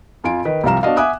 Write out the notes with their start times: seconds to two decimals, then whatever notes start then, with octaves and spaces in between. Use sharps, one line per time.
0.24 F2 F4 G#5 D7
0.45 D#3 B4
0.64 C2 F3 G3 F5 A#5 E7
0.83 B3 D4 F#4 D#5 F5
0.97 E5 F#5 G#5 D6 D#6 F#6